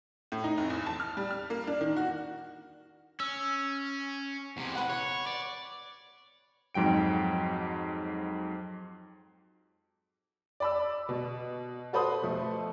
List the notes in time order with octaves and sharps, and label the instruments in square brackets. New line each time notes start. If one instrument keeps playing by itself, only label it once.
[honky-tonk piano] A2
D#4
F1
E2
A5
F6
G3
F6
A#3
D4
D#3
F#4
[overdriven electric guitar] C#4 [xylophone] E6
[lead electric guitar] E2 C3
[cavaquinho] B4 F#5
[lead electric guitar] C#5
D5
[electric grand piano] F2 G#2 F#3 G5 D7
[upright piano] D5 B5 E6
B2
F#4 A4 B4 C5 B5 D#6
B2 F3 A3